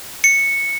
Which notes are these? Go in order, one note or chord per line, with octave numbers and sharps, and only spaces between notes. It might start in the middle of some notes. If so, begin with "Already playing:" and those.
C#7